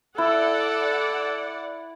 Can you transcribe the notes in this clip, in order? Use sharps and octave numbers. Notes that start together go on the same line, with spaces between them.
E4 A4 D5 F#5